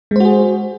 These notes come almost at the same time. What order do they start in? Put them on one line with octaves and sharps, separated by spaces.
G#3 C5 F#4 G#4